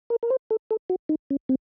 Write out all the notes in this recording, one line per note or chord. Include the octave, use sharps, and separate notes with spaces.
A#4
A#4
C5
A4
A4
F#4
D#4
C#4
C4